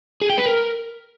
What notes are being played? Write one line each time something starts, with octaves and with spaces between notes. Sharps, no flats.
G#4
G5
B4
A#4